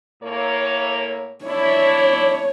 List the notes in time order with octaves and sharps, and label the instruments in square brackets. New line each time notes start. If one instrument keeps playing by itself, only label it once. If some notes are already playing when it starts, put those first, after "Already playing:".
[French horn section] A2 A#3 C#5
[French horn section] D4 E4 D5 [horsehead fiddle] C#5